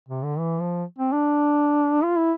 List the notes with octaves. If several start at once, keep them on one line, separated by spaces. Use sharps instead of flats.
C3
D3
E3
F3
C4
D4
F4
E4